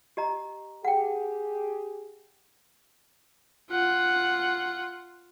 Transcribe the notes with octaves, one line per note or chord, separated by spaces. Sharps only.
G4 D#5 A#5
G4 G#4 F#5 G5
F4 F#5